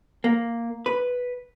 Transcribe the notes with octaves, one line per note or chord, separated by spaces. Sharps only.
A#3
B4